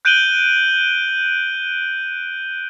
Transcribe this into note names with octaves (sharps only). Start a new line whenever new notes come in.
F#6 G6 D7 D#7 F#7 G7